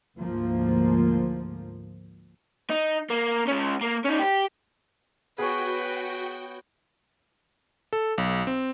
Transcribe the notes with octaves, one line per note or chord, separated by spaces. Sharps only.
D2 G#2 F3 A#3
D#4
A#3
G#3 C#4
A#3
C#4 D#4
G4
B3 F#4 G#4 B4 C#5 G5
A4
B1
C4